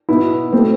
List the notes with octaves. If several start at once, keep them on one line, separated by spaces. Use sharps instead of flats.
B2 B3 E4
B2 A3 C4